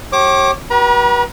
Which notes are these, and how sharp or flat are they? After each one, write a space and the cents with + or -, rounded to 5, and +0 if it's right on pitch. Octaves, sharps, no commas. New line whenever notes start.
G4 -30 C#5 -35 D6 +0
G4 -45 B4 -35 A#5 +40